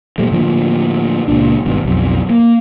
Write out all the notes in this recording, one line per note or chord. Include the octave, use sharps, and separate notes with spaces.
A#2 G3 A3
A2 D3 F3 A#3
C#2 A#2 D4
G#1 G2 B2
B1 F2
A#3